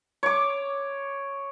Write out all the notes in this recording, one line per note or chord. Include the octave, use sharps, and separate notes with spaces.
C#5 D6